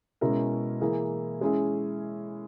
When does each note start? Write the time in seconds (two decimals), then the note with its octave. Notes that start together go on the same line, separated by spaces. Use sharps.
0.21 B2 G#3 C#4 E4 A#4
0.81 E3 A#3 E4 G#4
1.41 G#3 C#4 E4 G#4